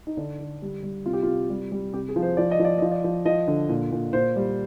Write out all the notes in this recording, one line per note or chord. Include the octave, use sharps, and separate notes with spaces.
D#4
D3 D4
D3
G3
G3
C3 F4
G4
C3 F4
G3
G3
C3 G4
G#4
F3
C5
F3 D5
D#5
F3
D5
F3 D#5
D5
F3
F3 D#5
D3
A#2
A#2
A#2 C5
G3